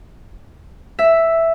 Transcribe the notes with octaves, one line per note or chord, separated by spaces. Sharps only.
E5